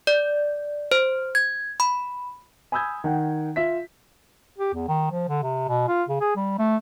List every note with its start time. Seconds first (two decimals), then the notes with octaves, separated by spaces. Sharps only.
0.07 D5
0.92 C5
1.35 G#6
1.80 B5
2.72 G#5 B5 D#6 E6 G6 G#6
3.04 D#3 F#5 G5
3.56 F4 E5 B6
4.58 G4
4.74 E2
4.88 D#3
5.12 F3
5.28 D3
5.43 C3
5.68 B2
5.88 F4
6.09 C#3
6.21 G#4
6.36 G3
6.59 A3